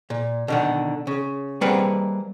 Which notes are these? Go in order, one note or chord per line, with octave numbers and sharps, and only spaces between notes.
A#2
B2 D3 D#3
C#3
G3 A#3 C4 G#4 B4 F#5